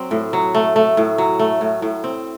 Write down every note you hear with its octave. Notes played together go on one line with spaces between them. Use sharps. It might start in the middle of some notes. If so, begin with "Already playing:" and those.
Already playing: F#3 C4
A2
F#3
A3
A3
A2
F#3
A3
A2
A2
C4